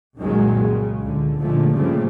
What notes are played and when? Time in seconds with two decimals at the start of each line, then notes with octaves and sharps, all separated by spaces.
0.18 C2 F#2 A#2 D#3 F#3 G#3
0.58 C#3
1.00 C#2 D3
1.40 A#2 D3 F3 G#3 A3
1.74 G2 A#2 C#3 F3 G3 A3